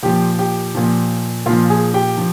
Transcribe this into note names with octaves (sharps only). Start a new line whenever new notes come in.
A#2 F3 G4 G5
G4 G5
A#2 F3
A#2 F3 F4 F5
G#4 G#5
G4 G5
F3